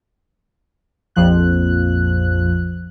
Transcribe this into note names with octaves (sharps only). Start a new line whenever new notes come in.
A#1 F2 F3 F#6